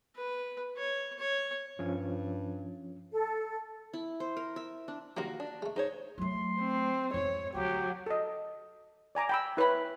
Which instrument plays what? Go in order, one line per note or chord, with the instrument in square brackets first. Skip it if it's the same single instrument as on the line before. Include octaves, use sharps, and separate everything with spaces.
[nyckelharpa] B4
C#5
C#5
[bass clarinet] G2 [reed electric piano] F3 C#4
[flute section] A4
[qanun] E4
C5
A#4
E5
D4
[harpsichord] G2 D#3 F#3 [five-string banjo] A#3 F4 F#4
[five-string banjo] D4
[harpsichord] G#3 A3
[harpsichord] G#2 [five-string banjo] D#4 C5 C#5
[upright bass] F#3 A3 [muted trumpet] C6
[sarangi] C4
[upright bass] F2 G#2 [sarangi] C#5
[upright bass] D2 [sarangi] F#3 [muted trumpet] G4
[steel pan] A4 D#5
D5 G#5 A#5 D6
G5 B5 E6
E4 B4 C#5 B5